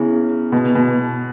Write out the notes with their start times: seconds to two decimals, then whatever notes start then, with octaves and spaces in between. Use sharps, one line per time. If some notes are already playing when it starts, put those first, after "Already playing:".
Already playing: C#3 B3 E4 G#4
0.52 B2
0.75 B2